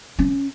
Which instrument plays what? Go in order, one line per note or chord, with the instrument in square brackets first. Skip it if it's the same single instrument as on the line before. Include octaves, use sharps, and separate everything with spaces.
[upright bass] C#4